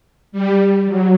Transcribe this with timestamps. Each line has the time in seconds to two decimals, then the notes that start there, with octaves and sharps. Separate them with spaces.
0.32 G3
0.86 F#3